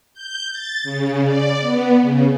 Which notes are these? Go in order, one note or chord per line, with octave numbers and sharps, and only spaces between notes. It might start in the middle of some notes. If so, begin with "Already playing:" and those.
G6
A6
C#3
D5
B3
C#3